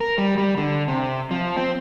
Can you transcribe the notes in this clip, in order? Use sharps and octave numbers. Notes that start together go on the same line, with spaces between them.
A#4
G3
G3
D3
C3
F3
C4